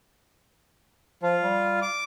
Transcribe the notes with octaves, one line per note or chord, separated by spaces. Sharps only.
F3 F4
G3
D6